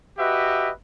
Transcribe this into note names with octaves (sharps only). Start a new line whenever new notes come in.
F#4 G4 B4 D#5 E5